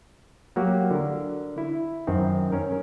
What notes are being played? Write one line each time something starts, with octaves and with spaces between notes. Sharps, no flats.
F#3 A#3 F#4 G4
D3 A#4
E4
F#2 D#3 C4
C#4 A#4